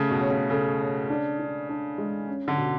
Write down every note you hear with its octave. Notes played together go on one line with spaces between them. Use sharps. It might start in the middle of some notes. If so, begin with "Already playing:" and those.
Already playing: C#3 A3
B2
C#5
C#3
C#3 A4
C#5
D4
D4
D4
G#3
C#4
D3
B2